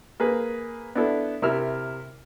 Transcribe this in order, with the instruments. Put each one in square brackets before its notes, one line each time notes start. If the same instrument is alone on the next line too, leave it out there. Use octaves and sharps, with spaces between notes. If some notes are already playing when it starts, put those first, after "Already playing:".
[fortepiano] A#3 G#4 B4
B3 D4 E4 A4
C3 E4 A#4 E6 F6